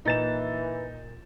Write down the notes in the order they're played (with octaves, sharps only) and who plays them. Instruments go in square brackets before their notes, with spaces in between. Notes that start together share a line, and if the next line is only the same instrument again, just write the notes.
[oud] A#2 [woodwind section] E3 [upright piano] D#4 A6 E7